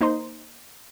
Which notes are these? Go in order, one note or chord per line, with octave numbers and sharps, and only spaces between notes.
A#3 D#4 C5 C6